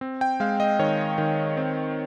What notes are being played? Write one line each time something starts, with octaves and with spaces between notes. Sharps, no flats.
C4
G5
G#3 F5
D#5
D#3 C#5
D#3
C4